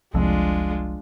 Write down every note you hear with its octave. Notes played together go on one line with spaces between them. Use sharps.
F1 C2 F2 G#3 D4 F4